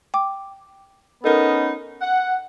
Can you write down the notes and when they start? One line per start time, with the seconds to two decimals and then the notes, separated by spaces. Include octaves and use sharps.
0.14 G5 D6
1.24 B3 C#4 D#4 A4 A#4
2.00 F#5